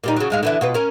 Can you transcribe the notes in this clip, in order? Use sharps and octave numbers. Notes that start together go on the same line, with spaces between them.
A#2 G3 D#4
C#3 F#3
G#2 G#3 F5
D3 E3 E4
B2 F4 B4
C#4 A#4